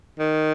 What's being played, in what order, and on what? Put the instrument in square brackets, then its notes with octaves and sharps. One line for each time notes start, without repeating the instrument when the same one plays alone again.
[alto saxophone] D#3